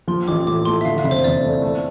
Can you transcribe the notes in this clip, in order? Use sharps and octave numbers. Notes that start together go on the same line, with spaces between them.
F3 C6
A1 D6
A2 D6
A3 C6
E5
D3 F5
E5
F1
C5
E2 D5
A3
A3